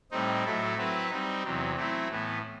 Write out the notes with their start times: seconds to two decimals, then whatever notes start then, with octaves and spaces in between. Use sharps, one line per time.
0.11 A2 G3 C4 D#4
0.45 A2 F#3 A3 E4 A4
0.77 F#3 C4 E4 B4
1.10 G3 C4 D#4
1.43 E2 C3 F#3
1.76 F#3 A3 C4 E4
2.09 A2 E3 B3